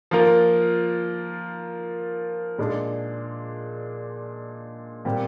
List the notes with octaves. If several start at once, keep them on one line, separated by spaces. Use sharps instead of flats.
F3 A#3 F4 A#4
A#2 G#3 D4
A#2 G3 C4 G4